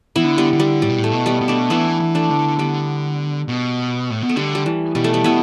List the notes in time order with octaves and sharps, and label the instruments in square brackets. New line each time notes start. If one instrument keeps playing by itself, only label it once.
[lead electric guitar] E3 [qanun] B3 E4
[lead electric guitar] D3
[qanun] G3 B3
[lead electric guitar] D3
[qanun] G3
[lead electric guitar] A2 [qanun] G3
[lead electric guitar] B2
A2
[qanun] A3
[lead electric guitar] B2
[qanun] G3 B3
[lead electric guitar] B2
[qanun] A3 D4
[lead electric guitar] E3 [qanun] B3 E4
[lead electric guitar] E3
[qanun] A3 D4
[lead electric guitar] D3
[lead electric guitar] D3 [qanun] G3 B3
[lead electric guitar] B2
A2
B2
[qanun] A3
[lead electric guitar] D3 [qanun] G3
[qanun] G3
E3
[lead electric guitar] B2 [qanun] G3
[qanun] A3
G3
[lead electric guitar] B2 [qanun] B3 E4